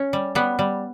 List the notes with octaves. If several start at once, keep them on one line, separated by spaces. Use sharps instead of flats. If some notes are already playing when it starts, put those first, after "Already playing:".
Already playing: C#4
G3
G3 B3
G3